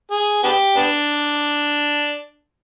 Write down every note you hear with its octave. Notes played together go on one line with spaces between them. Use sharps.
G#4
B3 D4 G4
B3 D4